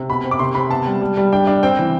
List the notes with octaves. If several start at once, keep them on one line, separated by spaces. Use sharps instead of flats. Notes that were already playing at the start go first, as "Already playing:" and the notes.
Already playing: C3
B2 B5
C4
D6
C3 C6
C3 B5
B3 A5
G3
G3
G3
D4 G5
D4
C4 G5
E3